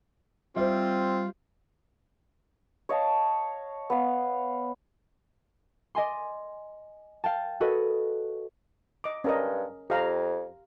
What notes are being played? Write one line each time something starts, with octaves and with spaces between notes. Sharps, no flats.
G3 C4 F4 C5 E5
C#5 D#5 F5 A5
B3 F5
D5 D#5 G#5 C6
F5 G5 A5
F#4 A4 B4 C#5 D#5
D#5 D6
G2 C#4 A#4 D#5
F2 G4 F5 A#5